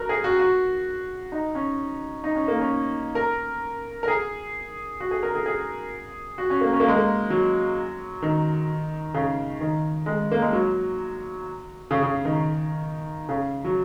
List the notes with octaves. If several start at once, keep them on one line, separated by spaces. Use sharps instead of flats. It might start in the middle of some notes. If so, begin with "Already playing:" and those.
Already playing: F#4 A#4
G#4
F#4
F#4
D#4
C#4
D#4
C#4
A#3
C#4
A#4
A#4
G#4
F#4
G#4
A#4
G#4
G#4
F#4
C#4
A#3
C#4
A#3
G#3
A#3
F#3
D#3
C#3
D#3
G#3
A#3
G#3
F#3
C#3
C#3
D#3
C#3
F#3